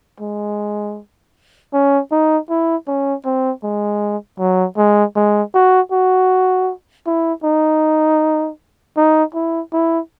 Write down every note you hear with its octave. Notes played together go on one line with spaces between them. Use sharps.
G#3
C#4
D#4
E4
C#4
C4
G#3
F#3
G#3
G#3
F#4
F#4
E4
D#4
D#4
E4
E4